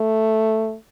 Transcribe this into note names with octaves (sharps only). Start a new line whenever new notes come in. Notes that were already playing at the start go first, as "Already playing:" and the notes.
Already playing: A3